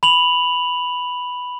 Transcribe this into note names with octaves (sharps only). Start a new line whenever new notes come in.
B5 F7 F#7